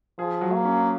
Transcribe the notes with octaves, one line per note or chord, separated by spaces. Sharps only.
F3 G#4
F#3
A#3
C#4